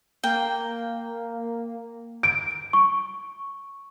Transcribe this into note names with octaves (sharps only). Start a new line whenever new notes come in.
A#3 G5
D7
C#6